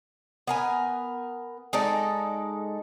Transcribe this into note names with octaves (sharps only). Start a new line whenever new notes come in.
B3 A#4 G#5
G#3 D#4 A4 D5